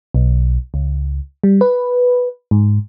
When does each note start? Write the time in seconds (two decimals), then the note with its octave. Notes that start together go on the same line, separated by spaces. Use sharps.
0.14 B1
0.74 C#2
1.44 G3
1.61 B4
2.51 G#2